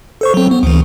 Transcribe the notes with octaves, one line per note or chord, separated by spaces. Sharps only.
A4 C5 C#6
F#3 C4
B3
D2 E3